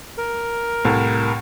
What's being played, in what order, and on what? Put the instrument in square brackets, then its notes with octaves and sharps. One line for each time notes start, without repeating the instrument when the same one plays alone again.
[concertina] A#4
[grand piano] C2 A2